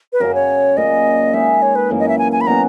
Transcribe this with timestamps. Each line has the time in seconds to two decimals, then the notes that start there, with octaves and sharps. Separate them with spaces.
0.13 B4
0.20 F#2 C#3 F#3 A#4
0.35 C#5
0.77 A#2 A#3 C#4 D#5
1.33 G#3 D#4 G#4 E5
1.62 C#5
1.75 B4
1.90 F#2 E3 A#3 C#4
1.99 D#5
2.08 E5
2.18 G#5
2.32 G#5
2.41 B5
2.47 B2 F#3 C#4 F#4 A#5